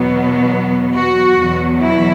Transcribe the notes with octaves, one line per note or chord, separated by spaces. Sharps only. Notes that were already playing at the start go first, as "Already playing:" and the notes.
Already playing: E2 B2 F#3 B3
F#4
E2 B2 F#3 B3
E4